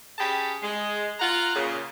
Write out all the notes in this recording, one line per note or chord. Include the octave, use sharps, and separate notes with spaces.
C#4 G4 G#4 G5 A5 B5
G#3
F4 F#5 A#5
A#2 C#3